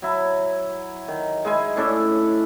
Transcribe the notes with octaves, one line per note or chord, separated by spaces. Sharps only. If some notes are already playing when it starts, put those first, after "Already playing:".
F#3 E4
D#3
G#3 E4 G#5
A2 C#4 D4 A4